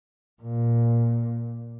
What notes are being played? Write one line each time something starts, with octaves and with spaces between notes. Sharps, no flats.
A#2